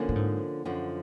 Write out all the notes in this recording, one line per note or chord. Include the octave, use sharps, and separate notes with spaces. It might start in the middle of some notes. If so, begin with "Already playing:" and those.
Already playing: D3 F3 A#3 C#4
A2
G#2
F#2 D3 F3